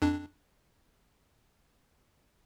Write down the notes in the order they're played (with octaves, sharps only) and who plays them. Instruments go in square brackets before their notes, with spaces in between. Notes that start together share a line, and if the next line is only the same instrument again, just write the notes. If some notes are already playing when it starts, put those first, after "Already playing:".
[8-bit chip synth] F2 D4